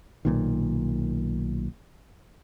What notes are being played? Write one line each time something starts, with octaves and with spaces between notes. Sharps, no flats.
B1 A#2 D#3